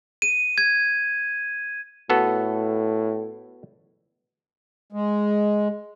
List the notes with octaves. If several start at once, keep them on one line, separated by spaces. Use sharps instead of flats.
D#7
G#6
A2 B3 F#4 A4
G#3